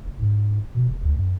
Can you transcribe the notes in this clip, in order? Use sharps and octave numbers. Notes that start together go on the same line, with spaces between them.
F#1
G#2
B2
F1
D2
F#2